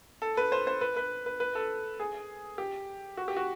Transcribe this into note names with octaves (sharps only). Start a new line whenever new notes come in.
A4
B4
C5
C5
B4
B4
B4
B4
A4
G#4
G4
F#4
G4
F#4